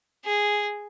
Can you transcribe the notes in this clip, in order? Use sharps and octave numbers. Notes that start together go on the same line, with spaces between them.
G#4